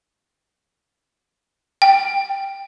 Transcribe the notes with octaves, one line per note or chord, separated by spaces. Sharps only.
G5